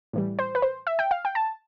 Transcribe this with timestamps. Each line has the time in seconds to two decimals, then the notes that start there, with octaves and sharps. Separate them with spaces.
0.13 A2 E3 G3
0.39 C5
0.55 B4
0.62 C5
0.87 E5
0.99 G5
1.11 F5
1.25 G5
1.35 A5